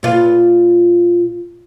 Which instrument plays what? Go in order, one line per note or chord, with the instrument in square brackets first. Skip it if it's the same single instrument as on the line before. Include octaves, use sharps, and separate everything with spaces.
[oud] A#2 F4 B4